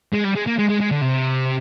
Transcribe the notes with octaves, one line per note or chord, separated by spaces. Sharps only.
G#3
G3
G#3
A#3
G#3
G#3
G#3
D3
C3